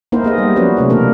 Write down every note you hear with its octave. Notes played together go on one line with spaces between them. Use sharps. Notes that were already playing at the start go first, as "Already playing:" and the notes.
A#3 B3 D#4 E4 A#4 C5
B3 G#4 D#5
G3
F3 F#3 C#4 F#4 B4 C5
C3 A3 C#4
B2 E3 A#3 D4 A#4